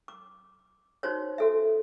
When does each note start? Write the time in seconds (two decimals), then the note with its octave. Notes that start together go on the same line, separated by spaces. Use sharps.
0.08 D6
1.03 D#4 F#4 C5 C#5
1.38 F#4 A4 E5